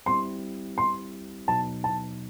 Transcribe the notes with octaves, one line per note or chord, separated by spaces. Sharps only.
G3 C4 E4 G4 C6
C6
B2 F#3 B3 D#4 A5
A5